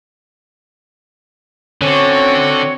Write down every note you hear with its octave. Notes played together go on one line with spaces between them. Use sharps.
D3 C4 C#4 F#4 C#5